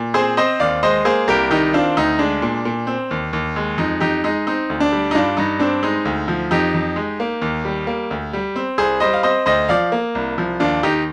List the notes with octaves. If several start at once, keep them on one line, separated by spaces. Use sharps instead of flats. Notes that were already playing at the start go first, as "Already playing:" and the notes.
Already playing: A#2
C4 G#4 C5
C4 C5 D#5
D#2 D5 F5
G#3 C5 D#5
A#3 G#4 C5
C2 G4 A#4
D#3 D#4 G4
C4 D4 F4
D2 D#4
G#3 D4
A#2
A#2
C4
D#2
D#2
G#3
F2 D#4
F2 D#4 G4
G#3 D#4
C4 D#4
D2
D4
G3
D#4
G2 D4 F4
G2 D#4
C4 D4
G#3 D#4
D2
F3
F2 D#4 G4
F2
G#3
A#3
D#2
G3
A#3
D2
G3
C4
C2 G#4 C5
G3 C5 D#5
F5
C4 C5 D#5
D2 C5 D#5
F3 D5 F5
A#3
C2
F3
D#2 D4 F4
D#2 D#4 G4